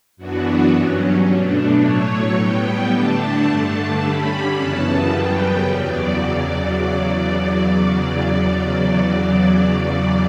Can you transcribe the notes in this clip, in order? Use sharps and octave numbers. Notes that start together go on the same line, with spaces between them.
F#2 E3 B3 D4 F#4
G2 F#3 C#4
B2 A3 D4
A2 F#3 A3 C#5
A2 G3 B3 G5
D3 A3 D4 A5
G2 D3 A3 D4 A5
D3 G3 C#4 B5
F#2 C#3 E3 B3 A5
F#2 C#3 G3 B3 G5
E2 C#3 F#3 D5